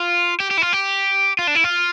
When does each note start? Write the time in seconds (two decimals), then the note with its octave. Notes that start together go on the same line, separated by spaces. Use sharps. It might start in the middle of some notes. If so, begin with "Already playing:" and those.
Already playing: F4
0.40 G4
0.51 G4
0.58 E4
0.62 F4
0.73 G4
1.39 F4
1.47 D4
1.55 E4
1.64 F4